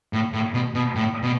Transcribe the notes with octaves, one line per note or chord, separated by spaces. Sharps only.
A2
A2
B2
B2
A2
B2